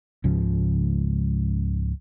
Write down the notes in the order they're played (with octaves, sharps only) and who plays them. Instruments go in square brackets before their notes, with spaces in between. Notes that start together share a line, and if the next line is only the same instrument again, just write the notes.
[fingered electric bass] C#2 G#2 C#3 F3